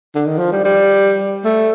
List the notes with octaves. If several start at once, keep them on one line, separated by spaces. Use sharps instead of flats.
D3
D#3
F3
G3
G3
A3